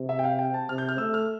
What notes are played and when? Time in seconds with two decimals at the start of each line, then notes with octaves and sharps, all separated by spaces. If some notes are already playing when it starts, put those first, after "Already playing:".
Already playing: C3
0.09 E5
0.19 G5
0.24 F5
0.39 G5
0.54 A5
0.69 C3 F6
0.78 G6
0.89 F6
0.98 A3 E6
1.14 F6